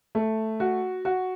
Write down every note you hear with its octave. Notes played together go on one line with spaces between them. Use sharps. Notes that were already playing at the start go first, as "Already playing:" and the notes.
A3
F#4
F#4